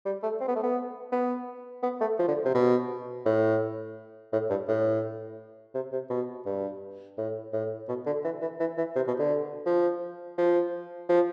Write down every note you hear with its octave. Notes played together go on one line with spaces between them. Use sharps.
G3
A3
C4
B3
A3
B3
B3
B3
A3
F3
D3
C3
B2
A2
A2
G2
A2
C3
C3
B2
G2
A2
A2
B2
D3
E3
E3
E3
E3
C3
B2
D3
F3
F3
F3